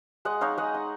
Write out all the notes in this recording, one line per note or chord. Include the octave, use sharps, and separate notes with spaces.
G#3 D#5 F#5
D#4 C#5 F5
G#3 D#5 F#5
D#4